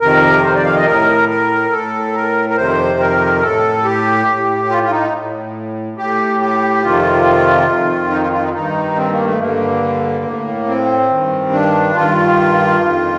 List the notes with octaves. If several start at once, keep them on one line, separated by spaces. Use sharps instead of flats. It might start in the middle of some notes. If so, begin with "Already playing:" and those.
F2 C3 D#3 A#4
C5
D5
F5
D#5
A2 A#4
A#4
A2 A4
A#4
A#4
F2 C3 D#3 C5
A#4
A2 A4
G4
A2
F4
F4
D#4
A2
A2 G4
G4
F2 C3 D#3 F4
F2 D#3
D#4
F4
F4
D#4
G2 D#3 D#4
C4
A#3
A3
G2 D3 A#3
A2
C4
G2 D#3
D4
G2 D#3 F4
F2 D#3